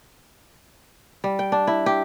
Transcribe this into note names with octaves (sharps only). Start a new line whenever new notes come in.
G3
G5
D4
E4
G4